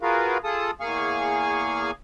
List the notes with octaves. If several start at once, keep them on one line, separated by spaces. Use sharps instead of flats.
F4 F#4 G#4 A#4 B4 F5
F4 G#4 A4 A5 D#6
E2 A#3 G#4 F5 G#5 C#6